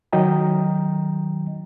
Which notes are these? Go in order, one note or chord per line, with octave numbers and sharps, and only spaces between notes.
D#3 F#3 D#5 G5 A#5